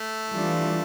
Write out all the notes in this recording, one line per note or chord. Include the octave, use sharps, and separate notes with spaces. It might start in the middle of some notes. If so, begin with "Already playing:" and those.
Already playing: A3
E3 G3 D4 F4